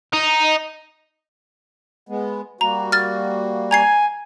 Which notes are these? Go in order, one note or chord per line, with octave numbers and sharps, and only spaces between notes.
D#4
G#3 B3
G3 A#3 F#4 A#5
F6 A6
G#5 A#5 G#6 C7